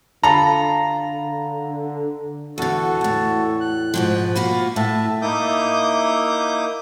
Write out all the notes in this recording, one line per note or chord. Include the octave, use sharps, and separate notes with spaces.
D3 F4 A4 A#5 B5
E2 D3 F#4 A4
E2 A2
F#6
G#2 B2 F3
A#3 F4 F#4 B5
A2 E5 A5
A#3 D#4 E4 D6 D#6 G6